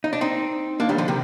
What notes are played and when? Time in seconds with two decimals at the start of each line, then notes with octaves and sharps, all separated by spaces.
0.04 D#4
0.13 D4
0.21 C4 D#4
0.80 A#3 D4
0.89 D#3 G3
0.98 D3 F3
1.08 C3 D#3